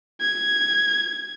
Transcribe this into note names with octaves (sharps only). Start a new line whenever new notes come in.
G#6